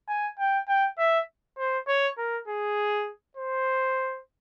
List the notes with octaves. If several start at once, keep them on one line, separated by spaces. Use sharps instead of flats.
G#5
G5
G5
E5
C5
C#5
A#4
G#4
C5